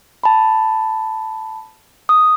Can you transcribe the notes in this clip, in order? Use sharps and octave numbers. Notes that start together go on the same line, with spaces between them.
A5 B5
D#6